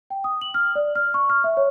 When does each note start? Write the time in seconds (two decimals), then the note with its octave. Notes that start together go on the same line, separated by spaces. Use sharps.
0.10 G5
0.24 D#6
0.41 F#7
0.54 F6
0.75 D5
0.95 F6
1.14 C#6
1.30 F6
1.44 E5
1.57 C#5